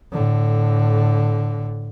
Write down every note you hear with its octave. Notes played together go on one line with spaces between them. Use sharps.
A2 D3